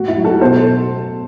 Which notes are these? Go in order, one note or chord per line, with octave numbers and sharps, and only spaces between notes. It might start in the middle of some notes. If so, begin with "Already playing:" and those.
Already playing: A2 F#4
E4
F#3
F#4 A4
B2 A4 C5